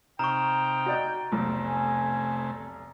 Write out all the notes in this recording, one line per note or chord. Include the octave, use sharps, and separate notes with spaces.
C3 D#4 G5 A#5 C#6 F6
F#4 D5 D#5
F1 B1 C3 A3
G#5